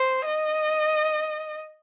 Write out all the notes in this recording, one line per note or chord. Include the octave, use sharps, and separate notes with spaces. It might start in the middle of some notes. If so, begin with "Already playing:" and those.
Already playing: C5
D#5